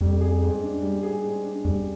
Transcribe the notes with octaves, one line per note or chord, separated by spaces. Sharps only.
F2 G3
G#4
G#2
D4
G3
G#4
G#2
D4
F2 G3